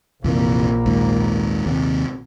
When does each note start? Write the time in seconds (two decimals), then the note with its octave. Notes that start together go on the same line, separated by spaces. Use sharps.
0.24 A#1 F2 C3 E3 A#3
0.86 D#2 G#2
1.66 D#2 C3